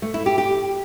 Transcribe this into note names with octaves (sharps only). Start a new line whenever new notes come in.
A3
E4
G4
G4